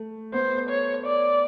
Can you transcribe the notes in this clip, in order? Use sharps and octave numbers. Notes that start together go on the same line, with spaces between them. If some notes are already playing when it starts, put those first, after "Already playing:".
Already playing: A3
B3 C5
C#5
D5